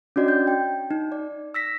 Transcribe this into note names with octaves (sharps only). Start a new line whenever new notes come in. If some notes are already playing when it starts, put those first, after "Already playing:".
C#4 D4 F#4 D5 D#5
G6
G5
D#4
D5
E6 A#6 B6